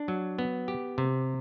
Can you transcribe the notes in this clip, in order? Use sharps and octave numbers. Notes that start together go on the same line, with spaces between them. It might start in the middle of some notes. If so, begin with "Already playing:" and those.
Already playing: D4
F#3
B3
G4
C3